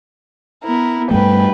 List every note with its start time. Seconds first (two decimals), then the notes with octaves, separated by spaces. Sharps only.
0.63 B3 E4 A#4
1.11 G2 G3 A3 B4 G5